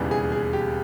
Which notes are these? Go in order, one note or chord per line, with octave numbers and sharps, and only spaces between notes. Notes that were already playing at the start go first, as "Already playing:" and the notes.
Already playing: E1 D#2 C#3 E3 G3
G#4
G#4
G4